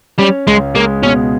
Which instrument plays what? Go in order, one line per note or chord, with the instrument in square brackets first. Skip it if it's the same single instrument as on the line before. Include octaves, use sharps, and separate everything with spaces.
[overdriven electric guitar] G3 [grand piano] C#4
[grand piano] C#2 [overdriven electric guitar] G#3
[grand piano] G#3 [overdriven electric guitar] A#3
[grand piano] B2 [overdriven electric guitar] C#4